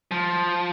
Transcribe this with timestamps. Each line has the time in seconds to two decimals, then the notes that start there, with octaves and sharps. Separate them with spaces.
0.11 F3